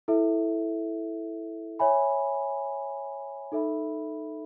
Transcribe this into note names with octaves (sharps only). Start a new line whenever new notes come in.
E4 A4 E5
C#5 E5 G#5 B5
D#4 A4 E5 B5